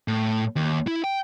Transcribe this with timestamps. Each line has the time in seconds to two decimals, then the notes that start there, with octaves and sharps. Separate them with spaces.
0.08 A2
0.56 D#2
0.87 E4
1.04 G5